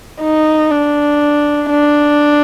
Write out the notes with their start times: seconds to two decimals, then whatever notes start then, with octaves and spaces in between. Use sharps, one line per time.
0.22 D#4
0.71 D4
1.70 D4